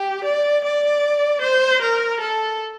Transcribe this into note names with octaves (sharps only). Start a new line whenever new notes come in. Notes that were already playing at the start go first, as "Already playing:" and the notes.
Already playing: G4
D5
D5
C5
A#4
A4